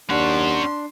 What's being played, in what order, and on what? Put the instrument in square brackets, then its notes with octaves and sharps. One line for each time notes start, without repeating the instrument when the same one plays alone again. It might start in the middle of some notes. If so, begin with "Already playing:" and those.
[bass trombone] D#2 [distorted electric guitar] C#4 F#5 [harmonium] D4 [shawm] C6